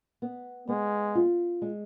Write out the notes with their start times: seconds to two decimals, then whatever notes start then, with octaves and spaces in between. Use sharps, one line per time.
0.22 B3
0.69 G#3 B3
1.15 F4
1.62 G#3